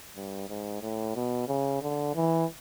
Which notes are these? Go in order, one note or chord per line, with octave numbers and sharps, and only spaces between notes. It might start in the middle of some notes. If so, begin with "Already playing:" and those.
G2
G#2
A2
B2
C#3
D3
E3